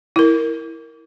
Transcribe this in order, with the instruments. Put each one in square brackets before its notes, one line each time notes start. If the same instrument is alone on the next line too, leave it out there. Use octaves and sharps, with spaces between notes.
[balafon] E4 A#4